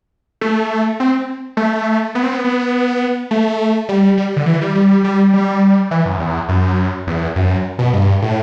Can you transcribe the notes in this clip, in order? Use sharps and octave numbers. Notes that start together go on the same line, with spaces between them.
A3
C4
A3
B3
C4
B3
B3
A3
G3
G3
D3
E3
G3
G3
G3
G3
E3
F#2
E2
F#2
E2
F#2
B2
G2
A2